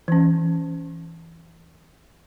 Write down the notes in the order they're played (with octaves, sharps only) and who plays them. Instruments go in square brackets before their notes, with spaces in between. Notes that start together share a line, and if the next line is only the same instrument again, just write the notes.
[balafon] E3 C#4